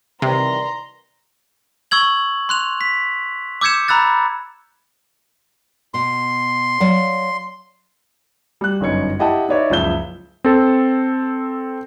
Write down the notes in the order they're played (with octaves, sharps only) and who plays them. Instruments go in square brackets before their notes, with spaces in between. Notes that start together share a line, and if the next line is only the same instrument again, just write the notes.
[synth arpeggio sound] C3 [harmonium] D#3 E3 G3 [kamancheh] A#5 C6
[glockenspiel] C#6 E6 G#6 F#7
C6 F#6 F7
B6
D6 E6 G6 G#6 C#7 E7
A#5 B5 E6 F#6 A6
[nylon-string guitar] B2 [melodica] C6
[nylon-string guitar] F#3 D5 F5
[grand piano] G3 F#6
G1 F#2 D#4 C#5 G#6 C#7
E4 G4 D#5 F#5 G5 A5
D#4 B4 C#5 D5 E5
F#1 C#2 F3 E5 G6 G7
[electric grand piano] C4 A4